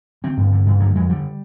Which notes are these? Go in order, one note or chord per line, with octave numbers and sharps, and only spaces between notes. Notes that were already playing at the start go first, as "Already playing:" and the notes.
D3 C4
G2
D3
G2
D3 A#3
F2 G#3
D3 G3